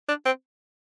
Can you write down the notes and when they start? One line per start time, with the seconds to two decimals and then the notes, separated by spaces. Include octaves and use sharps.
0.08 D4
0.26 C4